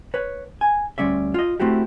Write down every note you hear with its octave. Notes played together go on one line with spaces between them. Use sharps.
B4 C#5
G#5
D2 G3 C#4 D5 E5
F4 D#5
A3 C4 E4 F#4 G4